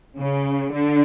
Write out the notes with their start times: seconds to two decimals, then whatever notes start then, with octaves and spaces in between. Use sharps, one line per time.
0.17 C#3
0.72 D3